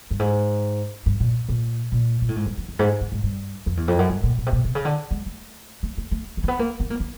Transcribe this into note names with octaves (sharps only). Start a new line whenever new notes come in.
G2
G#2
G2
A#2
A#2
A#2
A#2
A2
G#2
G2
F2
F2
G#2
G#2
G#2
G2
F2
E2
F2
F#2
G2
A#2
B2
C3
B2
C3
C#3
D3
G#3
A3
A3
A3
A3
A3
A#3
B3
A#3
B3
A#3
B3